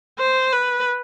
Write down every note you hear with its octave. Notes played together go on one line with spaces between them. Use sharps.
C5
B4